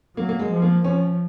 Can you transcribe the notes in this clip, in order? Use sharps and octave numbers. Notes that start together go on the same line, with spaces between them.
F#3 A#3
A#3
G#3
F3
A#3
F3 C#4